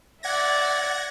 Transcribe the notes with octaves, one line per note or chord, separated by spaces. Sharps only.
D5 E5 F#5 G#6 A#6